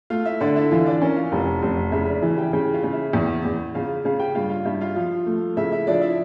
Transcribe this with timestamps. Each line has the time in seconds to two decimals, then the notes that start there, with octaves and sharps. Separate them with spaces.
0.10 A3 F4 F5
0.26 E4 E5
0.41 D3 D4 D5
0.56 E4 E5
0.71 E3 F4 F5
0.86 D4 D5
1.01 A#3 C#4 A#4
1.16 F4 F5
1.32 F1
1.62 F1
1.92 C#3 E4 E5
2.08 D4 D5
2.22 E3 E4 E5
2.37 G4 G5
2.53 C#3 G4 G5
2.73 F4 F5
2.83 C#3
2.93 E4 E5
3.13 E2
3.45 E2
3.75 C#3 F4 F5
4.04 C#3 F4 F5
4.20 G4 G5
4.35 G2 F4 F5
4.50 F4 F5
4.65 G2 E4 E5
4.81 F4 F5
4.96 F3
5.26 A3
5.57 C#3 E4 E5
5.72 E4 E5
5.87 F3 D4 D5
6.02 E4 E5